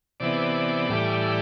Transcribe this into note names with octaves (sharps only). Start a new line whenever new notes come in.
C3 E3 B3 D5
A2 E3 G3